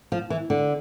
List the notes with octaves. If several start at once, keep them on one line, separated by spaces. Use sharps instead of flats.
F3
E3
D3